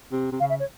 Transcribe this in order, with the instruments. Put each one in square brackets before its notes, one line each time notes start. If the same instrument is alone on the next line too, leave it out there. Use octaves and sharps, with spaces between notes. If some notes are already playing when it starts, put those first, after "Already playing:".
[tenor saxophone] C3
C3
[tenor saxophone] C#3 [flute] F5
[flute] E5
C#5